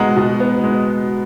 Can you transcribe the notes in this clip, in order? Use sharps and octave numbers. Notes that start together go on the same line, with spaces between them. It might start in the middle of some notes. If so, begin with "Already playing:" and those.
Already playing: B2 G#3 B3 F#5 A#5
B2
B3
G#3